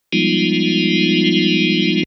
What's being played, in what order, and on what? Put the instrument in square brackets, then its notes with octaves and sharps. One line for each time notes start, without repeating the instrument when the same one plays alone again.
[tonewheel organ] F3 G3 G#3 B3 D#4 F4